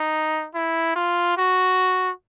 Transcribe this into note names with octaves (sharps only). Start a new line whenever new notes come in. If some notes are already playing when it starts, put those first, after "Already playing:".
Already playing: D#4
E4
F4
F#4